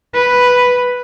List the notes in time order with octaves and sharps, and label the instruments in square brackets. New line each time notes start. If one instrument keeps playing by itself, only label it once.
[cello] B4